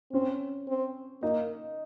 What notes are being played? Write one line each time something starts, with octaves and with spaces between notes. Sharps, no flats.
C4 C#4
C4
A#3 D#4